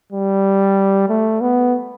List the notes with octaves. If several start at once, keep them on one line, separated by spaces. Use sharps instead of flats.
G3
A3
B3